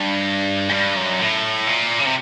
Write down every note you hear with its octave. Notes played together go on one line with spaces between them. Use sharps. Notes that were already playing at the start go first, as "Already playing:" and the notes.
Already playing: G2
G#2
G2
F#2
A2
A#2
C#3
C3